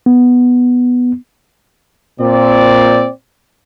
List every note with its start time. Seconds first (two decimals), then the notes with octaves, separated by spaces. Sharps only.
0.06 B3
2.20 A#2 C4 D5